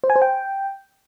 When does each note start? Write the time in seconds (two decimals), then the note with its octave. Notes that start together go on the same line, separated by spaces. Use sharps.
0.04 C5
0.10 G#5
0.16 C5
0.22 G5